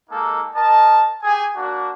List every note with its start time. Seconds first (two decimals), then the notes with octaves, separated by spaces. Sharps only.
0.10 G#3 A#3 D#4 A4
0.54 A#4 D#5 A5
1.23 G4 G#4 G#5
1.55 A#3 D4 F#4